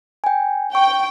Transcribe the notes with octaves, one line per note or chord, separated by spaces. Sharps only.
G5 G#5
G5 C#6